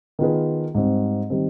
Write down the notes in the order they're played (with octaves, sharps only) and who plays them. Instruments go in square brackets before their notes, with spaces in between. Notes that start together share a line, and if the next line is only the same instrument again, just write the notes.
[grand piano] D#3 B3 F4 G#4 B4
G#2 G3 C4
D#3 G3 C4